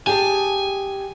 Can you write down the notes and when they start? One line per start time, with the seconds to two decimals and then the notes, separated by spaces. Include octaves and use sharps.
0.07 G4 G#4 G#5 A5